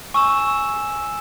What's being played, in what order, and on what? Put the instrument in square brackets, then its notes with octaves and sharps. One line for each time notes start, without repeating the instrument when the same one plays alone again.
[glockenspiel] G#5 E6 E7 [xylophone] C#6